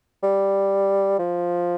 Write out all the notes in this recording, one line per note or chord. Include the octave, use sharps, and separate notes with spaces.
G3
F3